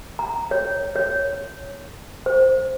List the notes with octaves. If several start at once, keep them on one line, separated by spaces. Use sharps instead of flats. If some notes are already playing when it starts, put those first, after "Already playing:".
A#5
C#5
C#5
C5